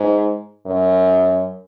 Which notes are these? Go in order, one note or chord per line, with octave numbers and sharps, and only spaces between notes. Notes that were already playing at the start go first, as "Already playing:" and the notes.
Already playing: G#2
F#2